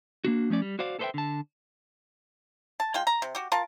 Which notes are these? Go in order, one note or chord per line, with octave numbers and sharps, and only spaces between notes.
A#3 D4 F#4
F3 A3 C#4 D5
G3
F#4 C5 D5 F5
A4 B4 C5 D#5 E5 G5
D3 A5
A5
G#3 F4 G5
A#5
C3
F#4 G4
F4 A#4 A5